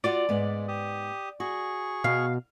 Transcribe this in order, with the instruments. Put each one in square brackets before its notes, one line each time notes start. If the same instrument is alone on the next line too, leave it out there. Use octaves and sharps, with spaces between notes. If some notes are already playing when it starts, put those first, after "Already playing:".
[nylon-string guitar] F4 F#4 F#5 [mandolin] D5
[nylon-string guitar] G#2 B3 [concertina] G#3
[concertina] G4 D#6
[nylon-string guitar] F#4 [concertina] G#4 C#6
[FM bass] B2 [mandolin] F5